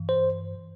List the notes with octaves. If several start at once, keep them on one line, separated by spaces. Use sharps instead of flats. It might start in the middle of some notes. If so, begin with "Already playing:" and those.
Already playing: G2 E3
C5